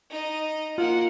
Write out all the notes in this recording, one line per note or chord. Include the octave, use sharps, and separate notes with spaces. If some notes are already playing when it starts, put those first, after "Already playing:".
D#4 D#5
A#3 F4 F#5